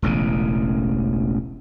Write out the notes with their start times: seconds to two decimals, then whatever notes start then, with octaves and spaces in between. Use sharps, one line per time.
0.02 E1 A1 C#3